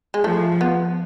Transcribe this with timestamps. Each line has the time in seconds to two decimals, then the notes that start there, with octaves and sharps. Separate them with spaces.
0.14 G#3
0.24 F3 A3
0.61 B3